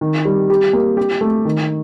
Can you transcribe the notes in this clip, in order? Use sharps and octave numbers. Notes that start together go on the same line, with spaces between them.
D#3
G3
G4
A#3
G4
A3
D#3